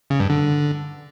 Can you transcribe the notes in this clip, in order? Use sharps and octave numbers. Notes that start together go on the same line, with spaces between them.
C#3
G2
D3